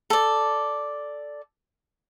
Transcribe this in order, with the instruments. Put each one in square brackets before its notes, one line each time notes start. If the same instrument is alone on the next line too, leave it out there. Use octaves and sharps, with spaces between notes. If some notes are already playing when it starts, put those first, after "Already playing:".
[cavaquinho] A4 D5